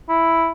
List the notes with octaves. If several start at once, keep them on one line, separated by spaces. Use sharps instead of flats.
E4